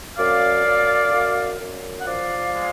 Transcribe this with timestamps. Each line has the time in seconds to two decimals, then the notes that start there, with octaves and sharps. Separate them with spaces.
0.17 F#2 D5 F5
0.65 F#2
1.12 F#2
1.59 F#2
2.00 F#5
2.06 F3 D5 F5
2.53 G#3